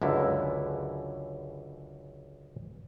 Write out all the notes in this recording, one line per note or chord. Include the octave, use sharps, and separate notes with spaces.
C#2 F#2 D3 E4